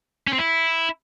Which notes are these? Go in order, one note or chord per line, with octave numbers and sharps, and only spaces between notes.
C#4
C4
E4